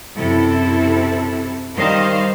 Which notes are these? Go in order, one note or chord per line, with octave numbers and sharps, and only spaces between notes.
F#2 C3 E4 A4
D#3 G3 C5 D#5 F5